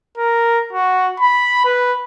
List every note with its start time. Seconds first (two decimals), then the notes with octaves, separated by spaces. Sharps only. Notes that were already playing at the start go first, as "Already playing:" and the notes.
0.18 A#4
0.73 F#4
1.20 B5
1.65 B4